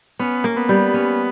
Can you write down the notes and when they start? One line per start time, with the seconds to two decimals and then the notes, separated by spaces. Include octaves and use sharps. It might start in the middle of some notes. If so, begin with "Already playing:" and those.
0.19 B3 C#4
0.44 A#3
0.57 B3
0.69 G3
0.94 C#4